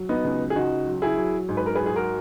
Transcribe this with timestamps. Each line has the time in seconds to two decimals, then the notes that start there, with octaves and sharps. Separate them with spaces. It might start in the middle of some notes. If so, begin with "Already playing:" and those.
Already playing: F#3
0.09 B3 D#4
0.24 C#2
0.50 G#4
0.56 C#2 D#4 F#4
0.87 F#3
1.02 E4 G#4
1.17 F#3
1.49 G#2
1.57 B4
1.66 A#4
1.75 G#4 B4
1.80 F#3
1.86 G#4
1.96 F#4 A#4